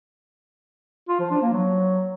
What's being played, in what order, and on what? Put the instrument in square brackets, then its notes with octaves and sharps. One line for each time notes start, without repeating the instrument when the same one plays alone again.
[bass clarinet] F4
F3
D4
A#3
F#3